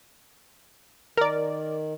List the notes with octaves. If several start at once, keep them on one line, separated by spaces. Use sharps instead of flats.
D#3 A#4 D5